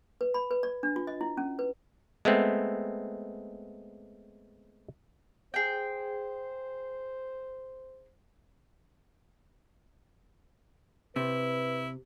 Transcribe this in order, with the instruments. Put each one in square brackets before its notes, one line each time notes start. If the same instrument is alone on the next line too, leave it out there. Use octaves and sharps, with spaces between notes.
[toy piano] B4
B5
B4
D5
D4
F4
D#5
E4
C#4
B4
[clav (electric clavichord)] G#3 A3 B3 C4
[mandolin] G#4 G5 [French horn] C5
[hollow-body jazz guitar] C3 [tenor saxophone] E4 [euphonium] B4